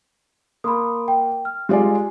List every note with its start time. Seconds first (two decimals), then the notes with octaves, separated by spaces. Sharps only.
0.64 A#3 B5 C6 D#6
1.08 G5
1.45 F6
1.69 G#3 F4 G4 D5 G#5